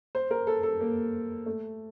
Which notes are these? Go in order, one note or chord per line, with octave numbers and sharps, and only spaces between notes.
C5
A#4
A4
A4
A#3
A3